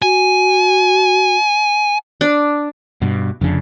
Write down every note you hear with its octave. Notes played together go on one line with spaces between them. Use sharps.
F#4 G#5
D4
G2 B2
F1 F2 C#3 D4